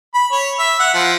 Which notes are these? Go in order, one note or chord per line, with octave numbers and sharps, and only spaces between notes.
B5
C#5
E5
F#5
F3